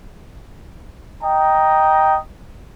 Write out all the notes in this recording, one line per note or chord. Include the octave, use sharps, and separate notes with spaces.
D#5 G5 A#5